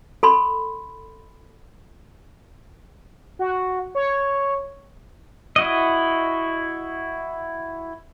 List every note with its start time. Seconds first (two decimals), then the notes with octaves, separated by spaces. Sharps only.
0.23 A4 B5 C6
3.39 F#4
3.95 C#5
5.56 E4 F#4 D#5